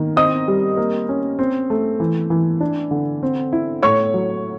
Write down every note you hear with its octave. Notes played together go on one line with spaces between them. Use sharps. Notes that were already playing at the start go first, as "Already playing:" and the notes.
Already playing: D#3 A#3
C4 D#5 D#6
G3
A#3
C#4
C4
A3
E3
E3
D4
D3
C4
E4
A2 C#5 C#6
F#3